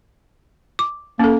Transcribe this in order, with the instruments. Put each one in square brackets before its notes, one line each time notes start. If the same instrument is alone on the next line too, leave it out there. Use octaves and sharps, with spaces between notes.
[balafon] D6
[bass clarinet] A#3 [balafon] C#4 A4